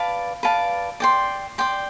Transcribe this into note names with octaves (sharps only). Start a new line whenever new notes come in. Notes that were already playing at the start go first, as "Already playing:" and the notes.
Already playing: B4 D5 F5 A5
B4 D5 F5 A5
D5 G5 C6
D5 G5 C6